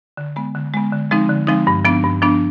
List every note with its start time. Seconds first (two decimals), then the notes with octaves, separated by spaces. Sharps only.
0.17 D3
0.36 G#3 B3
0.55 D3
0.74 G#3 B3
0.92 D3
1.11 F3 G#3 C4 D#4
1.29 D3
1.47 F3 G#3 C4 D#4
1.67 G2
1.84 F3 B3 D4
2.04 G2
2.22 F3 B3 D4